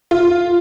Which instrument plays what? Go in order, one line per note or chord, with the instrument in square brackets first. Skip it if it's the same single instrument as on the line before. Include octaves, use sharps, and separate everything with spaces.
[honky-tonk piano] F4